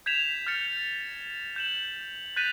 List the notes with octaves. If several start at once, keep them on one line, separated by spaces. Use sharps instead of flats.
G6 G#6 B6 E7 F7
F6 G6 A6 C#7
G6 E7 F#7
F#6 G6 A6 B6 D#7 F7